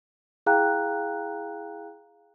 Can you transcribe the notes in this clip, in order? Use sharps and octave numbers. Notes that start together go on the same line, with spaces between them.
E4 G#4 F5 G5 A#5 F#6